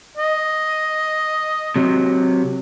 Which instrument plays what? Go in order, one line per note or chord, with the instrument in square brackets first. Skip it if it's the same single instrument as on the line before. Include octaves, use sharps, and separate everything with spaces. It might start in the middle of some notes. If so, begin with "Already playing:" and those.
[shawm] D#5
[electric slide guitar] C3 F#3